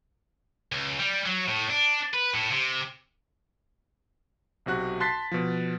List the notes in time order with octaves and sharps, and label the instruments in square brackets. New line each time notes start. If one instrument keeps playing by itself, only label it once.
[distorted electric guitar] C#2
G3
F#3
A2
D4
B4
A2
C3
[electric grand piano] B1 C3 F#4 F#6
A5 C6 F#6 A6 B6 C7
B2 F3